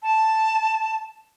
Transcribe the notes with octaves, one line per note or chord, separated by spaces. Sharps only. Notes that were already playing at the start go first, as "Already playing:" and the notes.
A5